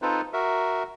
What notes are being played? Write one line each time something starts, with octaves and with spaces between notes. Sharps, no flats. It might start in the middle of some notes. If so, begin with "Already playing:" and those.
C4 D#4 F4 A4 B4 C5
F#4 A#4 E5